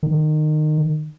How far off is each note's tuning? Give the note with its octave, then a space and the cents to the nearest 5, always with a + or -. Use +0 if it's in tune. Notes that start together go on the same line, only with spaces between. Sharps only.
D#3 -25